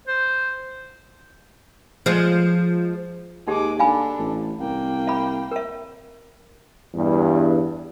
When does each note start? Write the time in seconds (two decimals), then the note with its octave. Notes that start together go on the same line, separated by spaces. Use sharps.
0.07 C5
2.06 F3 G#3
3.48 D#2 G#3 D#4 G4 D6
3.79 D4 A4 F5 G#5 B5
4.18 A1
4.61 C2 A#3 G5
5.07 E5 B5
5.51 A#4 E5
6.95 E2 G2